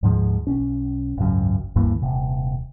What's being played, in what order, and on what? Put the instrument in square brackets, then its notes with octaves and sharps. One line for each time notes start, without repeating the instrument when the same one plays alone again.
[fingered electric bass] D2 G#2 F3 G#3
B1 C#4
G#1 C#2 F#2
D2 G2 E3 A#3
D#1 C3